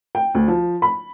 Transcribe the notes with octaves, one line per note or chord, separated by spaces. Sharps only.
G5
D2
F3
B5